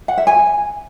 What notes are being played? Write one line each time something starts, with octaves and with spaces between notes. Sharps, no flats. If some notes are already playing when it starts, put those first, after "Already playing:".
F#5
E5
G#5